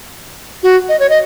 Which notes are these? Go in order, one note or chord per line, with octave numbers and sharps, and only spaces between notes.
F#4
D#5
C#5
D#5